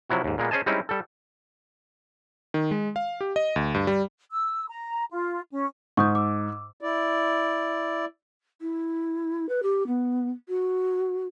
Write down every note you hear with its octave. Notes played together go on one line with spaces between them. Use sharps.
C3 F3 F#3 E4 F#4
D#2 G#2
A#2 G#3 A#3 B3
C#4 G#4 C5 D#5 G#5 A5
G3 G#3 C4 C#4 D#4 E4
G3 A4
D#3
G#3
F5
G4
D#5
D2
G2
G3
E6
A#5
F4
C#4
G#2 C#6 D#6 G6
D6 E6
E4 D5
E4
B4
G4
B3
F#4